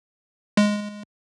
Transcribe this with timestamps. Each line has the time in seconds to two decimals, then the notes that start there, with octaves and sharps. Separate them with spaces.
0.57 G#3